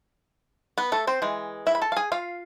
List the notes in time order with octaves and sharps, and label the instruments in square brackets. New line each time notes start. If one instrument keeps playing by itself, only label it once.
[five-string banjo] B3 B4
A3 A4
C4 C5
E3 G#3
E4 E5
B5
A4 A5
F5
G#4 G#5
F4 F5